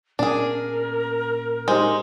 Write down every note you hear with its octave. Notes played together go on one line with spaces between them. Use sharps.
A#2 B3 C#4 D4 G#4 A#4
G#3 D#4 G4 C5